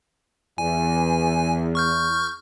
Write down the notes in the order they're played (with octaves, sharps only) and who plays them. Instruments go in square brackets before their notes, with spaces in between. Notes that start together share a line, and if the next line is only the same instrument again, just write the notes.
[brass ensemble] E2 [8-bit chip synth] G#5
[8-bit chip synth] C#6 F6 G6